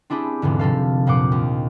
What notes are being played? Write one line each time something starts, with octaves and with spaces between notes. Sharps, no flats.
C4 D4 E4 G4 G#4
F1 E2 G#2 D3
C3 F3 A4 F5
F2 A#2 C5 F#5 D6
D#2